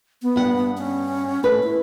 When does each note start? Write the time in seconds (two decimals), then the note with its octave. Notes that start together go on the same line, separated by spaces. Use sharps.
0.22 B3
0.36 G2 F#5
0.77 C#4
1.44 A3 B4
1.63 E4